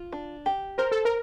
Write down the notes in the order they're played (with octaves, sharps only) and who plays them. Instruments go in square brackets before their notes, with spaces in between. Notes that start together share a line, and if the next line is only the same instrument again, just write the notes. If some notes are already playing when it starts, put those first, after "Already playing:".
Already playing: [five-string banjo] F4
D4
G4
[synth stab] A#4 [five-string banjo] C5
[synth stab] A4
A#4